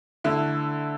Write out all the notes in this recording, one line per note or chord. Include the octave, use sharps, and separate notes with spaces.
D3 A3 E4